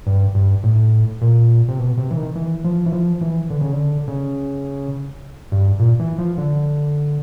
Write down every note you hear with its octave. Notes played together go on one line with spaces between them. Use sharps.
G2
G2
A2
A#2
C3
B2
C3
E3
D#3
E3
F3
E3
F3
E3
D3
C#3
D3
C#3
G2
A#2
E3
F3
D3